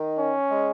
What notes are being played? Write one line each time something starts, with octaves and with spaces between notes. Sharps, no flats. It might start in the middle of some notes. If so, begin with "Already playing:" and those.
Already playing: D#3
C#4
G#3